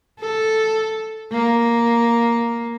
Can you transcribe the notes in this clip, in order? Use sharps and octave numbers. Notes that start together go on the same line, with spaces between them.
A4
A#3